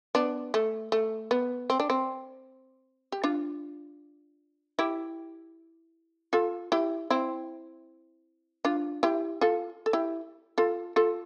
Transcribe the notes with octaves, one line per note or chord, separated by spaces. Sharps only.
B3 D4
A3
A3
B3
C4
D4
C4
G4
D4 F4
E4 G4
F4 A4
E4 G4
C4 E4
D4 F4
E4 G4
F4 A4
A4
E4 G4
F4 A4
F4 A4